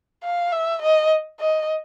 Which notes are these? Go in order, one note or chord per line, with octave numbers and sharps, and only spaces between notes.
F5
E5
D#5
D#5